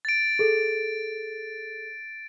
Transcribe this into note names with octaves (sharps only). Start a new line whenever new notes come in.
A6 D7
G#4 A4